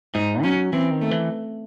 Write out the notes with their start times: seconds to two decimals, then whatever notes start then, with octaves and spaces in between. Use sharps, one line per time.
0.14 G#2 D#4
0.43 F#3 C#4
0.73 E3 C4
0.91 D#3
1.01 A3
1.11 E3